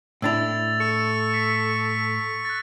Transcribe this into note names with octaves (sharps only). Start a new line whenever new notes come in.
A2 D4 E4 E6 A6 F7
A4 C#6 C#7
B6
F#6 A6